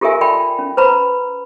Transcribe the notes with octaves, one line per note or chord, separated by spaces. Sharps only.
F4 G4 A4 A#4 E5 G#5
D5 E5 G5 A5 B5
C#4
B4 C5 A#5 B5